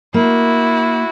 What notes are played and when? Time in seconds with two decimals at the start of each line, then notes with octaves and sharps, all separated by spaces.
0.14 A#3 E4 F#4